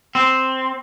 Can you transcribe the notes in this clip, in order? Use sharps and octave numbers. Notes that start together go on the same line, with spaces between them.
C4